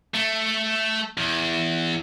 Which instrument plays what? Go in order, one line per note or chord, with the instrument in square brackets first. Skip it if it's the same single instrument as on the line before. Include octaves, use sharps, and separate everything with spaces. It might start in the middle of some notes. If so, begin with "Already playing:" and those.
[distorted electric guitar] A3
E2